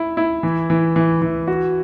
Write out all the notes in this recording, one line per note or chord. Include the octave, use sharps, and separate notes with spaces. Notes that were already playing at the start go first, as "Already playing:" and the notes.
Already playing: E4
E4
E3
E3
E3
E3
F#4